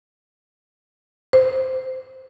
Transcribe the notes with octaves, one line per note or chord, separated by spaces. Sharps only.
C5